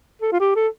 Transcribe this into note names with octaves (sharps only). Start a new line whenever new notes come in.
A4
F4
G4
A4